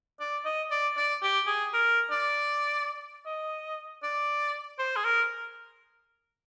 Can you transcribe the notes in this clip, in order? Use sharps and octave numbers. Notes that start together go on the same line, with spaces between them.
D5
D#5
D5
D5
G4
G#4
A#4
D5
D#5
D5
C5
G#4
A#4